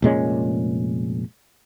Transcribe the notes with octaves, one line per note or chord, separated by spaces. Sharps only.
F1 A#2 G#3 C#4